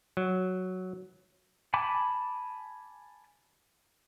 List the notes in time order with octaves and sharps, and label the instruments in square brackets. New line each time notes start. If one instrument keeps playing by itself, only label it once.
[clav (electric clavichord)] F#3
[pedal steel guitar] G#5 A5 B5 D6